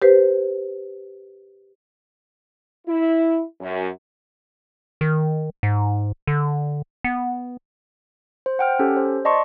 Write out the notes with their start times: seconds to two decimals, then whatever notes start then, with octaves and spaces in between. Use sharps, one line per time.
0.02 G4 B4 C5
2.87 E4
3.61 F#2
5.01 D#3
5.63 G#2
6.27 D3
7.04 B3
8.46 C5
8.59 F#5 G5 F6
8.79 C#4 G4 A4
8.97 C5
9.25 D5 D#5 A5 C6 C#6